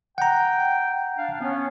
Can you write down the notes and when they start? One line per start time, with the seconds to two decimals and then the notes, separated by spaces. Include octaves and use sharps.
0.18 F#5 G5 A#5
1.18 D4 F5
1.41 B3 C#4